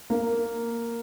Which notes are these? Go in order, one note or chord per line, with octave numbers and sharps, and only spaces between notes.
A#3